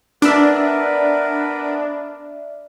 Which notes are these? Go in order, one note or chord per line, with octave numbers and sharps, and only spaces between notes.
B3 D4 A#4 B4 D5 E5